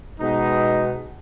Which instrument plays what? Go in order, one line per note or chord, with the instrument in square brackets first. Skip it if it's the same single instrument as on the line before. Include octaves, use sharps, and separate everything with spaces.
[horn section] B2 G#3 B3 D#4